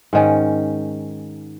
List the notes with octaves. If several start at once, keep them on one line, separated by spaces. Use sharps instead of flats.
G#2 D#3 C#4